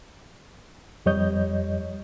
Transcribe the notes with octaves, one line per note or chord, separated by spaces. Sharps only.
F2 G3 C#5 D#5 G6